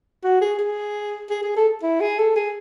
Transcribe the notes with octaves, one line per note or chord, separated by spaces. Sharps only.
F#4
G#4
G#4
G#4
G#4
A4
E4
G#4
A4
G#4